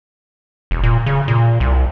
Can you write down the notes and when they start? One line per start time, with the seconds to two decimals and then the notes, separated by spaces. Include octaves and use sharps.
0.71 E1
0.83 A#2
1.06 C#3
1.28 A#2
1.60 C2